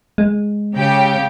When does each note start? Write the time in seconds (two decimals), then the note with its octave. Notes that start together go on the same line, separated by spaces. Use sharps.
0.18 G#3
0.75 C#3 G4 G5